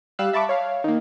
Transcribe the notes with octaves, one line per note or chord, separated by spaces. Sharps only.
G3 F5 E6 F#6
E5 A5 B5 C#6 D6
C#5 F5
D#3 A#3